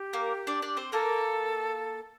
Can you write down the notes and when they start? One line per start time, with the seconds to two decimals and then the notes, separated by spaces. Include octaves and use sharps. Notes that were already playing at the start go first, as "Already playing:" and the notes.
Already playing: G4
0.13 A#3 A#4
0.47 D4 D5
0.62 D4 D5
0.77 C4 C5
0.92 A#3 A4 A#4